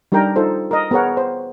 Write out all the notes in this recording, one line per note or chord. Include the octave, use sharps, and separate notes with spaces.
G3 D4 D#4 A#4 G5 A#5
D#4 F4 A4 C5
A#4 D#5
B3 G#4 A#4 C#5 F#5
C5